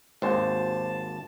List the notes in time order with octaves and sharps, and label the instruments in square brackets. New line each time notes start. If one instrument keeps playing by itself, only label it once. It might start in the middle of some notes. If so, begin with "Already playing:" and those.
[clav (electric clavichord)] G#1 D#2 [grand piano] C5 [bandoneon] A5